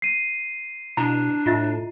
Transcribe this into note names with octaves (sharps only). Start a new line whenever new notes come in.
C7 D#7
B2 D4 E4 A#5
A2 F4 D#5 E5